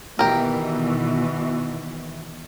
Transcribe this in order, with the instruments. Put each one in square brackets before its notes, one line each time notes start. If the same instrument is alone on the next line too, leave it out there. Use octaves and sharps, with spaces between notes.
[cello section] B2 D#3 E3 [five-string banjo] G4 A#4